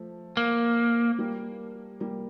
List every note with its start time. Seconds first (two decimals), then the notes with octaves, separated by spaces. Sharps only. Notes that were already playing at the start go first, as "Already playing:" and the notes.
Already playing: F3 A3
0.37 A#3
1.19 G3 A#3
2.00 G3 A#3